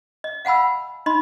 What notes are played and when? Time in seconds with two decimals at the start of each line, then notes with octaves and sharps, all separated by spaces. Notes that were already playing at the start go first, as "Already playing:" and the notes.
0.24 D#5
0.45 F5 F#5 G#5 B5 E6
1.06 D#4 D#5 B5 C6